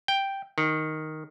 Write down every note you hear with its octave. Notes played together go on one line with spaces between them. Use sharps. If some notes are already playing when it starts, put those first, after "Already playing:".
G5
D#3